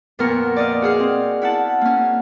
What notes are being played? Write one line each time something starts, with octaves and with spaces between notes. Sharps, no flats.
F2 A#2 B3 A#4 C#6
D5 D#5 F5
F#4 G#4 F5
C4
E4 F#5 A5
A#3 C#4